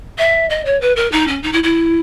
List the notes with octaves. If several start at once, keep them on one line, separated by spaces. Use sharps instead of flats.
E5
D#5
C#5
B4
A#4
D#4
C#4
D#4
E4
E4